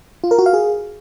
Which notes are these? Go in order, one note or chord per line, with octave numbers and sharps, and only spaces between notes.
F4
A#4
F#4
F5
G#4